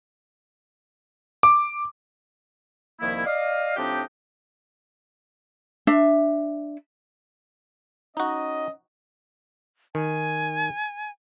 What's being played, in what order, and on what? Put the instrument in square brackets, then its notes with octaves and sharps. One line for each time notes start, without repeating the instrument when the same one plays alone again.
[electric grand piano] D6
[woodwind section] C2 D#3 F3 A#3 E4
D5 D#5 F5
A2 F3 C4 D4 D#4 G4
[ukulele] D4 E5
[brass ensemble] C#4 D#5 [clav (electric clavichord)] D#4 F#4
[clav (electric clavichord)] D#3 [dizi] G#5